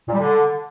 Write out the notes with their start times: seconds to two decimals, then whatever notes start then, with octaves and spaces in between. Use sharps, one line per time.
0.08 A#2
0.13 G3
0.19 D3